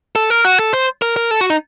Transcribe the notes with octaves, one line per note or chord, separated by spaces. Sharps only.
A4
A#4
F#4
A4
C5
A#4
A#4
A4
F#4
D#4